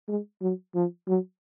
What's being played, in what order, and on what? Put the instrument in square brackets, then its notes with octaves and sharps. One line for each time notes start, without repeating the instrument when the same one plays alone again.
[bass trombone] G#3
F#3
F3
F#3